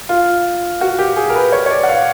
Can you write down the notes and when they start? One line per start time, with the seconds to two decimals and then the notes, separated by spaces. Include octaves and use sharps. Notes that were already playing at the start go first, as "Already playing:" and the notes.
0.09 F4
0.81 F#4
0.99 G4
1.17 G#4
1.29 A#4
1.35 B4
1.52 C#5
1.66 C#5
1.71 D5
1.84 F#5
1.89 F5